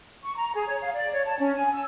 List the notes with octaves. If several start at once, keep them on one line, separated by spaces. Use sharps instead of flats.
C#6
A#5
G#4
C#5
F5
D5
C#5
A5
C#4
G#5
E6